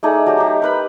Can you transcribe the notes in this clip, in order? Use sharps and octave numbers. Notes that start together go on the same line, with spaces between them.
A3 D#4 G#4 D5
F#3 G4
D#4 G4
A#4 B4 B5